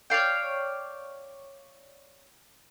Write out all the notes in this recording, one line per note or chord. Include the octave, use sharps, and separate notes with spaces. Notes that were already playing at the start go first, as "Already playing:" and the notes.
C#5 D5 F5 G5